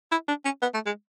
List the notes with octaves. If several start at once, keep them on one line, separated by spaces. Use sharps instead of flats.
E4
D4
C#4
B3
A3
G#3